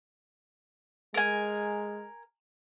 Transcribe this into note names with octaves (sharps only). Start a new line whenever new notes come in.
G#3 A#4 G#5